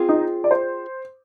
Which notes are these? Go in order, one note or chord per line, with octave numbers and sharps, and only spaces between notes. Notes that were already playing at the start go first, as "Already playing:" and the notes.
Already playing: C4 F4 G#4
D#4
D5
C5